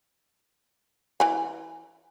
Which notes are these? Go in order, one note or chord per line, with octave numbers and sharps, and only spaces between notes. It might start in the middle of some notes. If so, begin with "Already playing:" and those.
E3 G#5